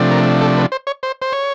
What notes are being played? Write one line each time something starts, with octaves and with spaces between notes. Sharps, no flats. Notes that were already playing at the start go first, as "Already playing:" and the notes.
Already playing: C3 F3 A3 D4
A#4
A4
B4
C5
C#5
C5
C5
C#5